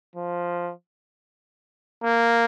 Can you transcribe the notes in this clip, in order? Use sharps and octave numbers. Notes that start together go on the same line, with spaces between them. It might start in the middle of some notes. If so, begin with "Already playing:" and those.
F3
A#3